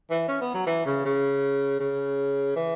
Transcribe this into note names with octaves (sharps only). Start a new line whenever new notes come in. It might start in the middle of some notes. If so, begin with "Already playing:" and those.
E3
C#4
B3
F#3
E3
C#3
C#3
C#3
E3